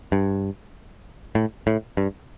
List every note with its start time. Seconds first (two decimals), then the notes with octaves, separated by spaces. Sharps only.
0.12 G2
1.35 A2
1.67 A2
1.97 G2